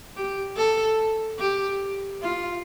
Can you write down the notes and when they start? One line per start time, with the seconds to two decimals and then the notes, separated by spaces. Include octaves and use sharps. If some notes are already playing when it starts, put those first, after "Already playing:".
0.17 G4
0.57 A4
1.39 G4
2.22 F4